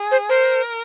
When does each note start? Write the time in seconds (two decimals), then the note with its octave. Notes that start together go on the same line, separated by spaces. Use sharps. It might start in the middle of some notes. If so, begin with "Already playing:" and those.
Already playing: G#4
0.11 C5
0.29 A#4 C5